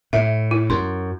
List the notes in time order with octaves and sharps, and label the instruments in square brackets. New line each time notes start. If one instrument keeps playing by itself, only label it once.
[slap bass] A2 [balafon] E5
[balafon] E4
[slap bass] F#2 [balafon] C6